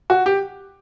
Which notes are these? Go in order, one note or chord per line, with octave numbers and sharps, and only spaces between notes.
F#4
G4